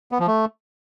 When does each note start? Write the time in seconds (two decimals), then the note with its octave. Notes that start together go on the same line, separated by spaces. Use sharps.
0.12 B3
0.20 F3
0.27 A3